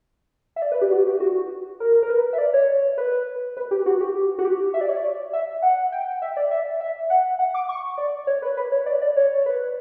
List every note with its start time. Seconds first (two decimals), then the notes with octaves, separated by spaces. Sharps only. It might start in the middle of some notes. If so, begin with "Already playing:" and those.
0.56 E5
0.62 D5
0.72 B4
0.81 G4
0.91 F#4
1.06 G4
1.20 F#4
1.80 A#4
2.03 A#4
2.09 B4
2.33 E5
2.38 D5
2.53 C#5
2.98 B4
3.57 B4
3.71 G4
3.86 F#4
4.01 G4
4.39 F#4
4.45 G4
4.74 E5
4.81 D5
4.89 C#5
4.95 D5
5.33 E5
5.62 F#5
5.92 G5
6.22 E5
6.37 D5
6.51 E5
6.80 E5
7.10 F#5
7.39 F#5
7.54 D6
7.69 C#6
7.98 D5
8.27 C#5
8.42 B4
8.57 B4
8.72 C#5
8.86 D5
9.02 D5
9.16 C#5
9.46 B4